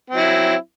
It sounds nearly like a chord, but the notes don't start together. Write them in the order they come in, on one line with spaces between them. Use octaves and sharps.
C4 F#3 E4